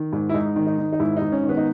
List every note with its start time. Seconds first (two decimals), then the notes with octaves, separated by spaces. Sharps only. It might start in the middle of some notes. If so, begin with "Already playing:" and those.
Already playing: D#3
0.13 G#2
0.29 E4
0.34 G#2 D#4
0.56 D#3
0.67 D#4
0.78 D#3
0.92 D#4
1.00 G#2 E4
1.17 D#4
1.22 G#2
1.32 C#4
1.43 D#3
1.49 B3
1.57 D#4